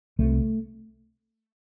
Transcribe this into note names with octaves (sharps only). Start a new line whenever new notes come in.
C2 C3 A3